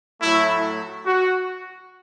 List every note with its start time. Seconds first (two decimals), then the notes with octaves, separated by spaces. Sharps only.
0.21 A2 F#3 A3 E4
1.05 F#4